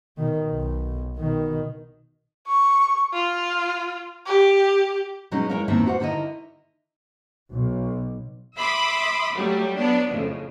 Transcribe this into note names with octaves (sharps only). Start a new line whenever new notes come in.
B2 D#3
B1
B2 D#3
C#6
F4
G4
B2 F#3 G#3 C#4 D#4
G#3 E4 A#4 C#5 D#5 F5
E2 A2 D#3 A#3 C4 E5
F#4 C5 F#5
D3 D#3 E4 A#4 D#5
B1
E5 B5 C6 D6 D#6
F#3 G3 A3
F#3 B3 D4
F2 A2 C#3